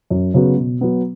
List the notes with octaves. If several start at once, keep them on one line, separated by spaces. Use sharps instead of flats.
F#2
C#3 F#3 B3 F#4
B2
F#3 B3